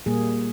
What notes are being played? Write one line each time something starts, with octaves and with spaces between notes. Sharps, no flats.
A#2 G3 A#3 G#4